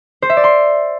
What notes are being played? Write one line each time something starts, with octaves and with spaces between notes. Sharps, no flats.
C5
E5
D5
C6